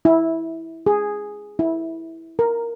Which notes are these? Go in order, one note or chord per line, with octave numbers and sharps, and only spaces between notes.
E4
G#4
E4
A#4